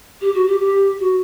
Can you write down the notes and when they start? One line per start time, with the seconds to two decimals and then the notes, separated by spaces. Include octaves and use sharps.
0.21 G4
0.34 F#4
0.47 G4
0.60 G4
0.99 F#4